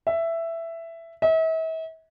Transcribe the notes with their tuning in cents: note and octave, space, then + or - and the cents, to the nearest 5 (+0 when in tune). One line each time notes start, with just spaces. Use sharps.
E5 +10
E5 -40